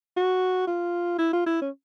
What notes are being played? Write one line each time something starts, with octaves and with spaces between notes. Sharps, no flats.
F#4
F4
E4
F4
E4
C#4